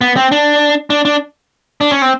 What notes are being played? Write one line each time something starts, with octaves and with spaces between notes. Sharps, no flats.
B3
C4
D4
D4
D4
D4
C#4
C4